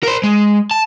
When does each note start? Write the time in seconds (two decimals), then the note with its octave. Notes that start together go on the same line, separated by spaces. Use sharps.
0.03 A#4 C5
0.24 G#3
0.71 A5